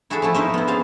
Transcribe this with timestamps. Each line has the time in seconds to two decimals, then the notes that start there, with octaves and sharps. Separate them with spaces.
0.10 E4 F#4 G#4 A4 E5
0.22 F3 A3 E4
0.34 D#4 E4 A#4 C5 D#5 E5
0.54 B3 E4
0.67 C#4 G#4 C5 F5 A5